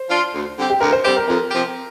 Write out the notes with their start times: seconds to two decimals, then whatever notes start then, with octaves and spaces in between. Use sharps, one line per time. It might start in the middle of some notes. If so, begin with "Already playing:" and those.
Already playing: C5
0.10 F3 D4 F4
0.34 D2
0.57 D3 G3 C4 G4
0.70 G4
0.80 D2 A#4
0.93 C5
1.04 D3 G3 C4 G4 C5
1.16 A#4
1.28 F2 A#4
1.51 C3 F3 C4 G4